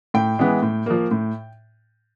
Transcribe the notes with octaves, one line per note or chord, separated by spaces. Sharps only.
A2 G5
E3 G#3 B3
A2
F3 A#3
A2